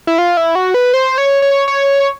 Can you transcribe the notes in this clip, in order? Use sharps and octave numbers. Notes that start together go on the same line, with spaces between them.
E4
F4
E4
F#4
B4
C5
C#5
C#5
C#5